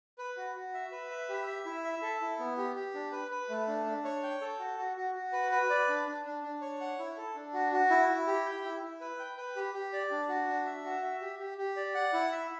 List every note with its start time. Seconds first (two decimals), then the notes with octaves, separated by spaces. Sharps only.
0.18 B4
0.37 F#4
0.55 F#4
0.74 E5
0.92 B4
1.11 E5
1.29 G4
1.47 E5
1.65 E4
1.84 E5
2.02 A4
2.21 E4
2.39 B3
2.58 G4
2.76 G4
2.94 D4
3.13 B4
3.31 B4
3.49 A3
3.68 D4
3.86 D4
4.05 C#5
4.23 G5
4.41 A4
4.59 F#4
4.78 F#4
4.97 F#4
5.15 F#4
5.33 B4
5.52 B4
5.70 D5
5.89 D4
6.07 D4
6.25 D4
6.43 D4
6.62 C#5
6.81 F#5
6.99 E4
7.17 A4
7.35 D4
7.54 F#4
7.72 F#4
7.90 E4
8.09 E4
8.27 G4
8.46 G5
8.64 E4
8.83 E4
9.01 B4
9.19 G5
9.38 B4
9.56 G4
9.74 G4
9.93 D5
10.11 D4
10.29 F#4
10.48 D4
10.66 E5
10.85 F#4
11.02 E5
11.21 G4
11.40 G4
11.58 G4
11.77 D5
11.94 F#5
12.13 E4
12.32 E5